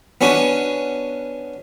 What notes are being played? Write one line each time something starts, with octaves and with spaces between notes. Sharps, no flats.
B3 C#4 D4 F#4